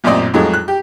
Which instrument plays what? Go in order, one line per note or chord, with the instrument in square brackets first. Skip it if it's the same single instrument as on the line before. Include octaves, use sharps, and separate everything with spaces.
[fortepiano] A1 F#2 A#2 C4 D5 D#5
F2 A2 F#3 G#3 A3
F#6
G4